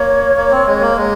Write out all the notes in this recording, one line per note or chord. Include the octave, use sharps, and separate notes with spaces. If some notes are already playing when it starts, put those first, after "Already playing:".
Already playing: A#3 C#5
A#3
C4
G#3
A#3
G#3